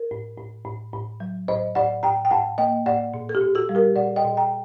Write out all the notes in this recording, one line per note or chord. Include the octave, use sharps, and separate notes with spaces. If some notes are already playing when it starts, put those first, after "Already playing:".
Already playing: A#4
A2
A2
A2
A2
F#3
A2 C5 D#5
A2 D5 F#5
A2 G5 A#5
G5
A2 F#5 A5
A#3 D#5 G5
A2 D5 F#5
A#2
A4
G4
A#2
F#4 A4
G3
G4 A#4
A#2 D5 F#5
D#5 G5
A#2
G5 A#5